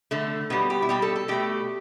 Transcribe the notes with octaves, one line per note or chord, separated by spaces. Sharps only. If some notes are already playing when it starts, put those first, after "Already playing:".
D3 A3
B2 G3 B3
G4
E4
B2 G3 G4
A4
A4
B2 A3 G4